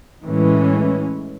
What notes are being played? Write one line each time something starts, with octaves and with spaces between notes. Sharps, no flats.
A2 E3 G#3 C#4